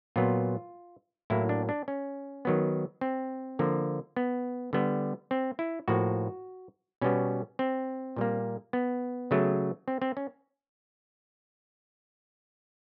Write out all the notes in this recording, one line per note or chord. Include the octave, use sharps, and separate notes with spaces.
A#2 F#3 B3 F4
A2 F#3 A#3 E4
D4
D4
C#4
D#3 F#3 B3
C4
D3 F3 A#3
B3
D3 G3 B3
C4
E4
A2 F3 A#3 F#4
B2 G3 B3 C#4
C4
A#2 G3 A#3
B3
C#3 F#3 A3
C4
C4
C#4